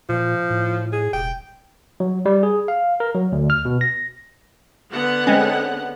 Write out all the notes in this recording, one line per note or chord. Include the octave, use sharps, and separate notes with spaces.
A#2 F3
A2
G#4
E1 G5
F#3
G3
G#4
F5
A#4
F#3
D2
F6
B2
A#6
D3 B3 F#5
G#3 C4 C#4